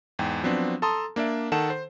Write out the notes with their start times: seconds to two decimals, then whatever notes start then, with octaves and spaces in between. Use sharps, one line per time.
0.19 E2 G#2 G5
0.43 F3 F#3 B3 C4 D4
0.82 A4 A5 A#5 C6 D#6
1.16 A#3 D4 D5 E5
1.52 D#3 A4 F#5 A5 E7
1.70 C5